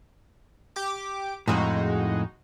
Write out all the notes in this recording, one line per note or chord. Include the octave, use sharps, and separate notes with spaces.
G4 D6
F2 A2 G#3 D#4 F#4